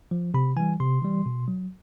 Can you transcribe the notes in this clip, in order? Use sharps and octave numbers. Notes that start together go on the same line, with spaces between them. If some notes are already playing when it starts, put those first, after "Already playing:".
F3
C3 B5
E3 G3 G#5
C3 C6
E3 G3
B2
F#3